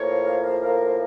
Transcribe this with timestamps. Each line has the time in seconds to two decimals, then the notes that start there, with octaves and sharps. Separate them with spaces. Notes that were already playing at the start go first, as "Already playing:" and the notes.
Already playing: A2 F3 A#3 C#5
0.62 A#4